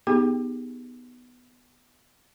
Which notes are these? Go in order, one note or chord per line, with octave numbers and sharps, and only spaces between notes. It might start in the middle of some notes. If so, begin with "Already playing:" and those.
B3 D#4 G4 G#4 G5